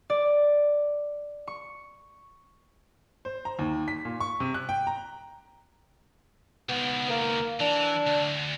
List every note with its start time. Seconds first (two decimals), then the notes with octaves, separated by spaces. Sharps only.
0.10 D5
1.48 C#6
3.25 C5
3.45 A#5
3.59 D#2
3.88 B6
4.05 A#2
4.20 C#6
4.40 C3
4.54 F#6
4.69 G5
4.87 A#5
6.69 C#2 D#3 B3
7.10 A#3
7.60 E3 D4
8.07 D2